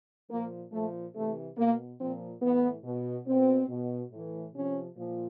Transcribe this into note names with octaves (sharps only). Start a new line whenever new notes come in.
A#2 F3 A#3
A#2 F3 A3
C3 E3 A3
B2 A#3
A#2 F3 C4
A2 E3 B3
B2
B2 C4
B2
A2
E3
C3 F3 C#4
A#2 F3